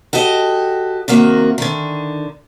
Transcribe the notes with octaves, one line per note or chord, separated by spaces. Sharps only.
F#4 G4 A4 D#5
C3 D#3 A#3 F#4
D3 D#3